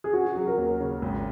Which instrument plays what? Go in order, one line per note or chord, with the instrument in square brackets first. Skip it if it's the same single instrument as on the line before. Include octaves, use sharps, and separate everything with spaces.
[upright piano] G#4
[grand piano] C#4 [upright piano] F#4
[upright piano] F#4
[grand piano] F#3 [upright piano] G#4
[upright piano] A#4
[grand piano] D#2
C#3
G#1